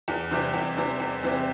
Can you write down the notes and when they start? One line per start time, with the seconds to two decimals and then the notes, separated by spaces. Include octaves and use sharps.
0.08 E2
0.31 C3 E3 G3 C4
0.54 E2
0.77 C3 E3 G3 C4
1.00 E2
1.23 C3 E3 G3 C4